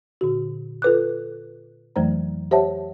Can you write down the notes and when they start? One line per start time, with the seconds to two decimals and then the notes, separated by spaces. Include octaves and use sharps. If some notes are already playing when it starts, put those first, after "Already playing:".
0.21 A#2 D3 F#4
0.82 F4 A4 B4 D6 F#6
1.96 F2 E3 F#3 A3 C5 A#5
2.51 G4 C5 C#5 E5 F#5 A5